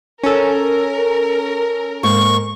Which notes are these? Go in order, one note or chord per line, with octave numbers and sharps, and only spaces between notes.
C#4 A4 A#4
G#2 A#3 C#6